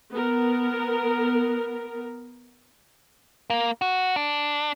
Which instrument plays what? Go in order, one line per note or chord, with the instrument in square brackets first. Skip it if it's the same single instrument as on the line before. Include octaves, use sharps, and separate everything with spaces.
[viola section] B3 A#4
[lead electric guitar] A#3
F#4
D4